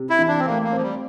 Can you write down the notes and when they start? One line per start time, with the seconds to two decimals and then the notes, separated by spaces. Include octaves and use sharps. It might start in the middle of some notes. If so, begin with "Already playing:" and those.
Already playing: C3
0.10 E4
0.19 E3
0.28 D4
0.39 C4
0.45 A3 A#3
0.64 A#3
0.73 F3 C4
0.82 G3